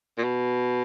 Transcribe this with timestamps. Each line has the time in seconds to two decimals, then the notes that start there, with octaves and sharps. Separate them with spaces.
0.18 A#2
0.24 B2